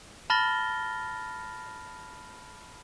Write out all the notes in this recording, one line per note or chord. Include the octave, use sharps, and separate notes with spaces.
A5 B5 F6 A6 A#6 G7